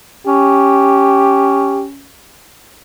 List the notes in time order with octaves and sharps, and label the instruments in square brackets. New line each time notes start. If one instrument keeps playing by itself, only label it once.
[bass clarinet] C#4 [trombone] G4